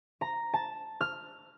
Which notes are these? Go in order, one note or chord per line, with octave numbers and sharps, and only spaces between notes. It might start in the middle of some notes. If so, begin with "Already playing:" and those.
A#5
A5
F6